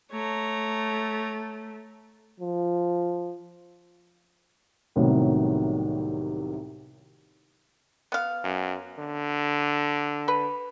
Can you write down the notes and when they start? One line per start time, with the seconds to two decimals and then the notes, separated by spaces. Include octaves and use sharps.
0.12 A3 C#5 A#5
2.40 F3
4.96 C2 A2 C3 D#3 F#3 B3
8.12 B3 F5
8.44 F#2
8.99 D3
10.28 B4